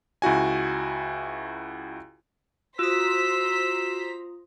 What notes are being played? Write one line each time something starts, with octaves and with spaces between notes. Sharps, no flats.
C#2 E4 F#4 G#5
F4 F#4 C5 A#5 D#6 E6 B6